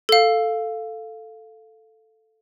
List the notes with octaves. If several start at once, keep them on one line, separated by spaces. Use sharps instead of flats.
A4 F5